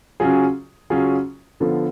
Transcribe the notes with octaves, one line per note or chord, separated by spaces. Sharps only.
C#3 F#3 C#4 F4 G#4
C#3 F#3 C#4 F4 G#4
D3 F3 B3 F4 A4